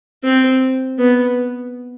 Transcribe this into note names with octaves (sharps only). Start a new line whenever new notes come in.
C4
B3